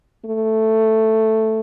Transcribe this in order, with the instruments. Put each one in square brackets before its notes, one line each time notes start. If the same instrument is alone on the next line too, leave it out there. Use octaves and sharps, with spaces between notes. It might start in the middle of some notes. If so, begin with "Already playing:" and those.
[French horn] A3